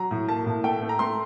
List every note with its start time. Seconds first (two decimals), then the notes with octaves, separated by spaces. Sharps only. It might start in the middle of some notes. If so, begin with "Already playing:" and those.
Already playing: F#3 A#5
0.11 A2
0.28 A#3 A5
0.46 A2
0.64 A3 G5
0.82 A3
0.89 A#5
0.99 A3 C6